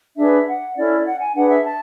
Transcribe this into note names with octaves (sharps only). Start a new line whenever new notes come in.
D4 G#4 B4 E5
F#5
C#4 E4 A4 D5
F#5
G#5
D4 G#4 B4 F#5
E5
A5